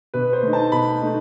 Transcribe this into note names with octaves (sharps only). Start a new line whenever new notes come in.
B2 B4
C5
A3 D#4
A5
B2 B5
A3 D#4